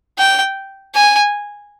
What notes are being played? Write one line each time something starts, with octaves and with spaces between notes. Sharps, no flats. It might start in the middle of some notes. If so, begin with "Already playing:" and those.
G5
G#5